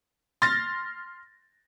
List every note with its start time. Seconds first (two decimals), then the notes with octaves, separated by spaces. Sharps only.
0.42 C6 F6 A6 A#6